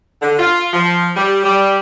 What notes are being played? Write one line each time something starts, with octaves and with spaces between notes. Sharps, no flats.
D3
F4
F3
G3
G3